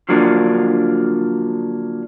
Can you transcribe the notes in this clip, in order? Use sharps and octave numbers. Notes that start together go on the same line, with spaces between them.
D3 F3 F#3 A#3 D4